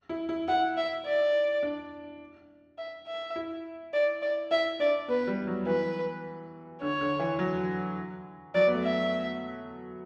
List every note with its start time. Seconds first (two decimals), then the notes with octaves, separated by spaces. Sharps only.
0.09 E4
0.29 E4
0.48 E4 F#5
0.77 E5
1.05 D5
1.63 D4
2.78 E5
3.07 E5
3.36 E4
3.93 D5
4.22 D5
4.51 E4 E5
4.79 D4 D5
5.08 B3 B4
5.27 G3
5.47 F#3
5.66 E3 B4
6.81 D3 C#5
7.01 D3
7.19 E3
7.39 F#3
8.54 F#3 D5
8.67 B3
8.74 A3
8.83 E5